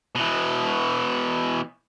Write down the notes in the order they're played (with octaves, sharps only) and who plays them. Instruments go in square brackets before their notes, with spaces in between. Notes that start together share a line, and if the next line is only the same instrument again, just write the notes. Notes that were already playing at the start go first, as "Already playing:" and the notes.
[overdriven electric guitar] B2 E3